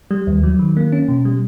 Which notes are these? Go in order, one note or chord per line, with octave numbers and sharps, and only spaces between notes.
G3
D#2
F#3
D#3
A#3
C#4
B2
G3